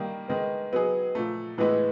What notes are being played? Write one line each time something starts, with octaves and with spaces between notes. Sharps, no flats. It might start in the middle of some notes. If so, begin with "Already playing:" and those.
Already playing: D#3 G3 A#3
D#3 G#3 B3
F#3 B3 D#4 G#4
A#2 F3 A3
A2 E3 G#3 B3 E4